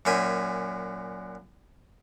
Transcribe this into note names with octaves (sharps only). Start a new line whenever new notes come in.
F#2 A#2 E5 G5 G#5